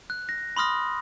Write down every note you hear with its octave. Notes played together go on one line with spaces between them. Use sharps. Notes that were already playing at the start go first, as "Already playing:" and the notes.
F#6
A#6
B5 C6 D#6 F6 A#6